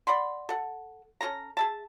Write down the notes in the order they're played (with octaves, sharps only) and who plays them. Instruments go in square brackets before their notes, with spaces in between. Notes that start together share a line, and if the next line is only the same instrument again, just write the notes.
[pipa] D5 F#5 B5 C6
A4 F#5
C#4 F4 A4 A#5
G#4 E5 A5